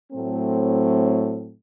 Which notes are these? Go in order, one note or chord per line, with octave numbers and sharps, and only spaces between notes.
A2 F#3 A3 C4